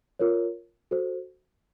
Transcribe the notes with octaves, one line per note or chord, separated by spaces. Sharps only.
F4 A#4 C#5
F#4 A4 C5